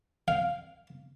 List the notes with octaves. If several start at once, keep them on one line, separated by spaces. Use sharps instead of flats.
F5